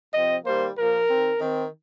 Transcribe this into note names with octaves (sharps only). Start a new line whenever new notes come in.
C3 F3 C4 D#5
D#3 G3 A#3 C5
A#2 F3 A#3 A#4
D#3 C4
D#3 C4